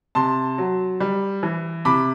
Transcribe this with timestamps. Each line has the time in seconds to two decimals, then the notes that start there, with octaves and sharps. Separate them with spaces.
0.15 C3 A5 C6
0.58 F#3
1.00 G3
1.43 E3
1.85 C3 B5 D6